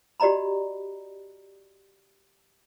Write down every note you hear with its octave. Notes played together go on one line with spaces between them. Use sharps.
F#4 G4 D5 D#5 A#5 B5